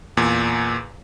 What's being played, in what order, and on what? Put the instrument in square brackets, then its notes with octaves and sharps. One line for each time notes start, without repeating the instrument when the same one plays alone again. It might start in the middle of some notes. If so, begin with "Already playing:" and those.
[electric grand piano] E2 A#2